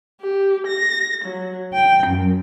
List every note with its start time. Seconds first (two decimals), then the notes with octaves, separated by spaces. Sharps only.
0.22 G4
0.67 A#6
1.24 F#3
1.74 G5
2.07 F#2